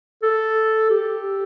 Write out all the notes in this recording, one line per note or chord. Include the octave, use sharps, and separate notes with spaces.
A4
G4